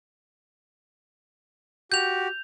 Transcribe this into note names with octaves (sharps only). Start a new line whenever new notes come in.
F#4 G4 G6 F7